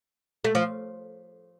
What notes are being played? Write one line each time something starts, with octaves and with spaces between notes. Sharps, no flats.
A3
F3